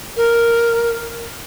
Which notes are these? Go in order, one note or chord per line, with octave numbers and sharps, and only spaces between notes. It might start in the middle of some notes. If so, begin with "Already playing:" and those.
A#4